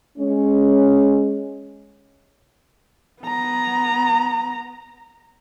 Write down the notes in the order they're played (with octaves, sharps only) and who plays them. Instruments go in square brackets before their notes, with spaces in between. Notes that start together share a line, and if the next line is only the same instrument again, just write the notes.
[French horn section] G#3 C#4
[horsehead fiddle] B3 A#5